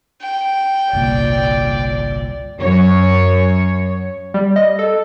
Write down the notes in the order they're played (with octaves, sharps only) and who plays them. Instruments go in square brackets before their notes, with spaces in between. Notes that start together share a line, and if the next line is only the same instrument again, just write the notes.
[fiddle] G5
[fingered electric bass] G1 C2 A#2 [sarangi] D5
[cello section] F#2 C#5
[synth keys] G3
D#5
A4